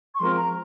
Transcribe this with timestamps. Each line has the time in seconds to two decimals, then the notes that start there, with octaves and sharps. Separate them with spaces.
0.15 C#6
0.19 F3 G#3 C4 F4 A#4 C6
0.37 A#5